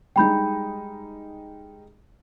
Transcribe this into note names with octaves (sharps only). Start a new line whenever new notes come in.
G3 G#3 D#4 G5 B5 G6